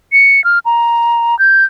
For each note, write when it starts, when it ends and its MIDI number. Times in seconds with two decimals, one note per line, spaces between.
0.12 0.43 97
0.44 0.59 89
0.66 1.38 82
1.39 1.65 91